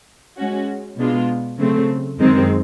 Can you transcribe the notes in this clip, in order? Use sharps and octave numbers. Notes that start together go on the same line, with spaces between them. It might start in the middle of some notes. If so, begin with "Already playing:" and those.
G#3 C#4 F#4
B2 G#3 B3 D4 F4
C#3 F#3 A3 C4
F#2 D#3 G#3 C4